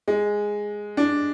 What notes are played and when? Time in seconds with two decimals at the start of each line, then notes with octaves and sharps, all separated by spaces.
0.08 G#3
0.97 D4